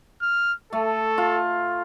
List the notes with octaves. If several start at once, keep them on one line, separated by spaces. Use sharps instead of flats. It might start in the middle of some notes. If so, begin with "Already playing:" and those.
F6
A3 A4
F4